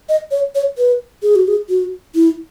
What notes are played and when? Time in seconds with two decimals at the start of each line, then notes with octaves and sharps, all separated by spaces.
0.09 D#5
0.31 C#5
0.55 C#5
0.78 B4
1.23 G#4
1.36 F#4
1.48 G#4
1.69 F#4
2.15 E4